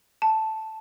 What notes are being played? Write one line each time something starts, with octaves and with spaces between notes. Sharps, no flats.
A5